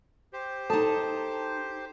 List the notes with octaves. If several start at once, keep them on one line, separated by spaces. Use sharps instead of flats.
G4 C5
D#4 A4 A5